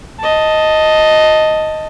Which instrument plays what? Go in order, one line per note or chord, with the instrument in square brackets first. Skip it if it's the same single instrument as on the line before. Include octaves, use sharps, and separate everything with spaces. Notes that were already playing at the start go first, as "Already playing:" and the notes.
[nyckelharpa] D#5 A5